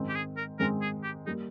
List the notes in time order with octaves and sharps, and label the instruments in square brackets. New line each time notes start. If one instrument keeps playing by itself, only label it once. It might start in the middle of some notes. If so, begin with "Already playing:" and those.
Already playing: [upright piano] G#2 D#3 G#3 C4
[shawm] G4
G#4
A#4
[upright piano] G#2 D#3 G#3 C4 [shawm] A#4
[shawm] G#4
G4
[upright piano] G3 A#3 [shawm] D#4